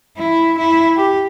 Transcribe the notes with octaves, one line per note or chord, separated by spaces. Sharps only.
E4
E4
G4